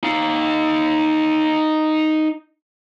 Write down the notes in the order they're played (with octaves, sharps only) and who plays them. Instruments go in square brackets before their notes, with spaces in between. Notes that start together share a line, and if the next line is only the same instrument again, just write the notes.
[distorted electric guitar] D#4 F5